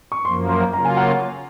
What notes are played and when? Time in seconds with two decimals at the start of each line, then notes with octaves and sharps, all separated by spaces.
0.12 C#6
0.25 F#2 F3 A#3 C6
0.49 C6
0.73 C#3 F#3 A#3 F4 A#5
0.85 G#5
0.97 F#5